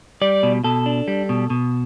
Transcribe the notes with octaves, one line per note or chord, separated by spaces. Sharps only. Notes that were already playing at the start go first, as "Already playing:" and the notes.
G3 D5
B2
B2 A4
D4
G3
B2
B2